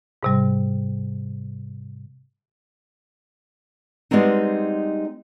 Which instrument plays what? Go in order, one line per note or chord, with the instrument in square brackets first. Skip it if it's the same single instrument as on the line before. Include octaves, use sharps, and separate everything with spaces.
[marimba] G#2 C3 G3
[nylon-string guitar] G3 G#3 B3 C4 D#4